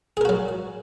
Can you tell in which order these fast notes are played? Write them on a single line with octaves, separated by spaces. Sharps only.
G#4 A#4 F#4 F#3